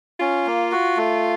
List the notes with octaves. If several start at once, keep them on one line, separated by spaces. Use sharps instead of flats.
C#4 F4
A#3
F#4
A3